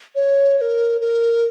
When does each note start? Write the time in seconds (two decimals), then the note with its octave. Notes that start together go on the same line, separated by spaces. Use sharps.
0.15 C#5
0.58 C#5
0.61 A#4
1.01 A#4